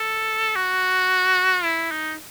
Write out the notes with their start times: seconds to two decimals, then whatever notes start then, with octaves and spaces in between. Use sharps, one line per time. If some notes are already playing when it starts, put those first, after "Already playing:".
Already playing: A4
0.56 F#4
1.63 E4
1.91 D#4